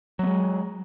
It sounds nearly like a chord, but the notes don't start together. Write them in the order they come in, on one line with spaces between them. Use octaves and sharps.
F#3 B3 G#3